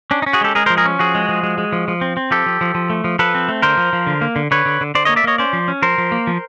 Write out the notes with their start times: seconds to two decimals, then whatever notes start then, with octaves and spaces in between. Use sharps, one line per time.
0.11 C#4 D4
0.22 D#4
0.26 C#4
0.33 F#4 G#4
0.41 G#3 G4 A4
0.55 G#3 G#4 A#4
0.66 A#4 C5
0.70 F3
0.77 G#4 A#4
0.85 C#4
0.99 F3 F#4 G#4
1.15 G#3
1.29 F3
1.43 G#3
1.58 G#3
1.72 F3
1.88 F3
2.01 C4
2.17 C4
2.31 F3 G4 A4
2.46 F3
2.61 F3
2.75 F3
2.90 A3
3.04 F3
3.19 F3 A4 B4
3.34 C4
3.48 A3
3.62 D3 A#4 C5
3.77 F3
3.93 F3
4.07 D3
4.21 A#3
4.36 D3
4.51 D3 B4 C#5
4.66 D3
4.81 D3
4.95 D3 C5 D5
5.05 A#3 C#5 D#5
5.16 D5 E5
5.24 A#3 C#5 D#5
5.38 C#4 C5 D5
5.53 F3
5.68 C#4
5.82 F3 A#4 C5
5.98 F3
6.12 A#3
6.27 F3